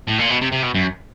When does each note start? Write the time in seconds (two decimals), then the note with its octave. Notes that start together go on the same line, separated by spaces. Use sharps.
0.09 A2
0.19 A#2
0.30 B2
0.42 C3
0.52 C3
0.63 B2
0.75 F#2